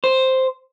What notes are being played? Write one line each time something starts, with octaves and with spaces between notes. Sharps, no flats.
C5